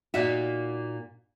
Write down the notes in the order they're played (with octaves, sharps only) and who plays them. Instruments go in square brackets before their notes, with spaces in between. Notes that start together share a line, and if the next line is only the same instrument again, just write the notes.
[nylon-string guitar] A#2 A#3 D#4 F#4 E5